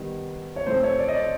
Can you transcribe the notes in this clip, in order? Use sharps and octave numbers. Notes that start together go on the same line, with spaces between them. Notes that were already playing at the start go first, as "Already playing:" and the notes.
Already playing: D#3 G3 B3
C#5
A2 F3 A3 C4 C5
C#5
D5
D#5
D5